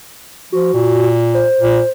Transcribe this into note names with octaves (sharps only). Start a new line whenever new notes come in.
F3 F#4
A#2
C5
A#2